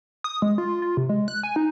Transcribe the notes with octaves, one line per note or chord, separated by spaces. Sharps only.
D#6
G#3
F4
F4
C3
G#3
F#6
G#5
D#4